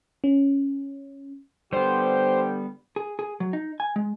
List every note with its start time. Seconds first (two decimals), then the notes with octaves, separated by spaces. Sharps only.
0.24 C#4
1.73 D3 G3 B3 G4 C5
2.96 G#4
3.19 G#4
3.40 F#3
3.53 D#4
3.80 G#5
3.96 G#3